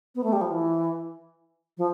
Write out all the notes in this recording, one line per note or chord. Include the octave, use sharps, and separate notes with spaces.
B3
A3
G3
F3
E3
F3